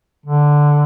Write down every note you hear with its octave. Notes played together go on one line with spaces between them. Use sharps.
D3